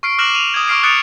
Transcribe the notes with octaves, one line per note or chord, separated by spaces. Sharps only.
C#6 F6 C7 D7
D6 F6 F#6 A#6 E7 F#7
D#7 F7
D#6 G#6
C#6 D6 F6 C7 D7
D#6 F#6 A6 C#7 D7 F7